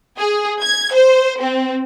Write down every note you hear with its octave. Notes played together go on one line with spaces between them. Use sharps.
G#4
G#6
C5
C4